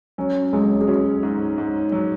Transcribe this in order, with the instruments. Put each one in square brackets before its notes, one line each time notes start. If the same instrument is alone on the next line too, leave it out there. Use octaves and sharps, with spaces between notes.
[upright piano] F#3 [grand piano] C#4
[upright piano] F#3 [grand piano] G#3
[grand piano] G#4
[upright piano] C#4 [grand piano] F#4
[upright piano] G#2
G#2
F#3